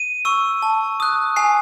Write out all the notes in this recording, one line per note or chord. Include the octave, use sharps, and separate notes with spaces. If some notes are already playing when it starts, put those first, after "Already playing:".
Already playing: D#7
C#6 E6
A5
D#6 F#6
G#5 C7